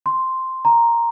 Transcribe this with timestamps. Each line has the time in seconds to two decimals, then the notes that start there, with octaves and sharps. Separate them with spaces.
0.06 C6
0.65 A#5